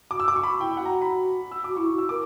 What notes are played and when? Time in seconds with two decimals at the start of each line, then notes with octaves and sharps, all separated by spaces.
0.11 F#4 D6
0.20 E6
0.27 F#4 D6
0.36 C#6
0.43 F#4 B5
0.60 E4 G5
0.77 F#4 F#5
0.85 A#5
1.02 B5
1.51 E6
1.64 F#4 D6
1.77 E4 C#6
1.93 F#4
1.98 E6
2.09 A#4 D6